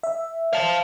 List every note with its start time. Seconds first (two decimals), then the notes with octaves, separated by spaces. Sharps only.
0.03 E5
0.53 F5 A5